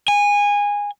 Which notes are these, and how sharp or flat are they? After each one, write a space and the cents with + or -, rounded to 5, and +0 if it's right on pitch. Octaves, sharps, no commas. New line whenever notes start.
G#5 -20